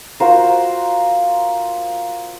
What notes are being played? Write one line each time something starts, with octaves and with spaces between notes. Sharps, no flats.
F4 F#4 A#4 C5